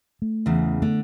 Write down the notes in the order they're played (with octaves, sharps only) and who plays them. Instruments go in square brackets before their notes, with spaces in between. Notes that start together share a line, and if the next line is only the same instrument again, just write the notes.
[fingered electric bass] A3
[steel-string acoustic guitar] E2 C#3
[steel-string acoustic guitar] D3 [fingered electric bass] A3